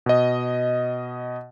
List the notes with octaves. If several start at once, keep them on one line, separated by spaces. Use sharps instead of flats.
B2 D#5